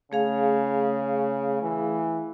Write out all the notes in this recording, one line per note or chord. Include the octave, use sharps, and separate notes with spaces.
C#3 A3 G#4 F5
E3